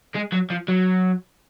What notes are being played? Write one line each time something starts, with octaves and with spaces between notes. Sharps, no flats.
G#3
F#3
F3
F#3